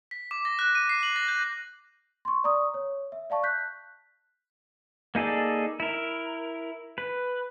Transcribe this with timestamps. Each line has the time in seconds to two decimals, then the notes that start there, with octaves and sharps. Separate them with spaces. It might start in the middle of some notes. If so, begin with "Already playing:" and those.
0.11 B6
0.31 D6
0.45 A#6
0.59 F#6
0.75 D#7
0.89 C7
1.03 F#7
1.16 A#6
1.28 G6
2.25 C6 C#6
2.44 D5 A#5 C#6 D#6
2.74 C#5
3.12 E5
3.30 D5 F5 A5 C#6
3.43 F#6 G6 B6
5.15 A#3 D#4 G#4 A4 D5
5.80 E4 A#4
6.98 B4